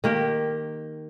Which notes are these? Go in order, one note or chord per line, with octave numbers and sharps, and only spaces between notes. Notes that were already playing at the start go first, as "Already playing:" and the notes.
D#3 A#3 G4